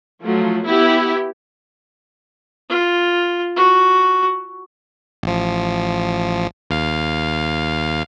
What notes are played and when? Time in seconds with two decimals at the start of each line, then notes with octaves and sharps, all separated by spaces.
0.23 F3 F#3 A3
0.66 B3 E4 G4
2.69 F4
3.56 F#4
5.23 A1 F3
6.70 D#2 F5